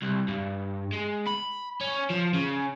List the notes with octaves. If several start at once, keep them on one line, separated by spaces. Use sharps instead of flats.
C2
G2
G#3
B5
C#4
F3
C#3